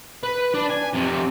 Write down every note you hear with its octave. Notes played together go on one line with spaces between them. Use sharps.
B4
D4
G#5
F2 C3